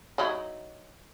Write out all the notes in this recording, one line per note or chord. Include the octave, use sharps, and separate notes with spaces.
F#3 D#4 E4